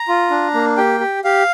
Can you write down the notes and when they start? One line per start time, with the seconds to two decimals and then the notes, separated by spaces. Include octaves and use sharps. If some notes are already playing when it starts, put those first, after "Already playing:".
Already playing: A#5
0.08 F4
0.30 D4
0.54 A#3
0.77 G4 G5
1.00 G4
1.24 G4 F5